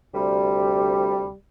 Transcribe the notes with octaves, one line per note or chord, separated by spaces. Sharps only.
D2 C3 G3